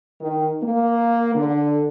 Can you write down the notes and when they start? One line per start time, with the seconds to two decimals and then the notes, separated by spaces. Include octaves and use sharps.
0.21 D#3
0.63 A#3
1.35 D3